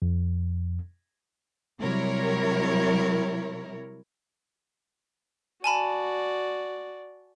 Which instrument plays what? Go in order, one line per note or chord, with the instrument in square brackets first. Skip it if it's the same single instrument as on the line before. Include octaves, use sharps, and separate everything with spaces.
[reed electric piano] F2
[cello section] C3 F#3 G3 E4 A#4 C#5
[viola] F#4 D5 [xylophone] G#5 A5 B5